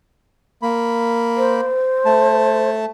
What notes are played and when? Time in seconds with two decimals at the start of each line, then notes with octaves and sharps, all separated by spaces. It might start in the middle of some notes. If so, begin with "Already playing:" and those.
0.62 A#3 B5
1.37 C5
2.06 A3 A5